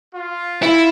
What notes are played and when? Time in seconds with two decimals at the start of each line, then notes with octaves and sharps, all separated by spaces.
0.15 F4
0.63 E4